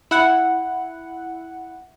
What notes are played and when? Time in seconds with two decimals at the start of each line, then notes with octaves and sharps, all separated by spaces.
0.11 E4 F#5